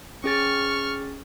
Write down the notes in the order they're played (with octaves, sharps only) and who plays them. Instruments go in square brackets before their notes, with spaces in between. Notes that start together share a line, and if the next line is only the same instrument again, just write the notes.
[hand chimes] C#4 G#4 A6 [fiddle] C#6 F6